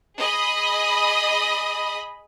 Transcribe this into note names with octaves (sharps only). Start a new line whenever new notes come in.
G#4 D#5 B5 D#6